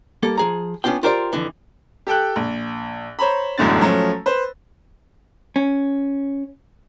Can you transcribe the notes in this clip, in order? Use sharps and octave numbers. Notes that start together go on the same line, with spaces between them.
G3 A#3 A4
F3 G#4 A#5
B3 C#4 D4 F4 G5
F4 G4 A#4 C5 D5 G5
F2 D3 E3
G4 A4 G5 F#6
A#1
C5 C#5 A#5 B5
E1 B1 F#2 A2 D3 A6
F3 F#3 A3 C#4
B4 C5
C#4